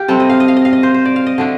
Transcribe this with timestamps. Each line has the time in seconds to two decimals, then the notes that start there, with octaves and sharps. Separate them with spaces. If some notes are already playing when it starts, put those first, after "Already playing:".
Already playing: G4 F5
0.08 C3 G3 C4 A4
0.20 D#5
0.29 F5
0.40 D#5
0.48 F5
0.57 D#5
0.65 F5
0.73 D#5
0.83 C5
0.94 C5
1.05 D5
1.16 F5
1.26 D#5
1.38 D3 A3 D4